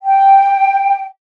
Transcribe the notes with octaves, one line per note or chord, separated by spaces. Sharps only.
G5